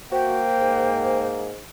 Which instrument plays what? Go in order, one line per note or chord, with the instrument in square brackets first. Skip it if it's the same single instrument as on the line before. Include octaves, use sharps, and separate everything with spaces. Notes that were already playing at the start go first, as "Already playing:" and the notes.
[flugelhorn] A#3 [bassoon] F#4 [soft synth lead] C5 [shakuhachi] G5
[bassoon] G#2